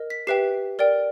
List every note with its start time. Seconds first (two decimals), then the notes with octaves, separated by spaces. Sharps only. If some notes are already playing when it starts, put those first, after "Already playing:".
Already playing: A#4 D#5
0.10 B6
0.27 G4 B4 E5 G5 C7
0.79 A#4 D5 G5